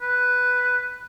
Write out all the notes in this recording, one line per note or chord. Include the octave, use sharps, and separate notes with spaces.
B4